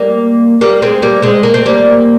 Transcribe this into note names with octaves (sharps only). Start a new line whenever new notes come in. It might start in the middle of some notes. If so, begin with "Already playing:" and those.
Already playing: G3 A#3
G3 A#3
G#3 C4
G3 A#3
G#3 C4
A#3
C4
G3 A#3